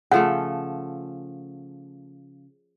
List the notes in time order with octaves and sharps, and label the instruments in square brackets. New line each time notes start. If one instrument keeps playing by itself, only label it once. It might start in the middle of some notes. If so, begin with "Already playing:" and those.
[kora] C#3 F3 A3 [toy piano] F#5